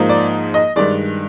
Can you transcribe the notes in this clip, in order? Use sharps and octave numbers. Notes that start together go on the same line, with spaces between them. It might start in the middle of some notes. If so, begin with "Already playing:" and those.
Already playing: G#2 F3 A#3 D#4
D5
D#5
G2 D#3 G#3 D5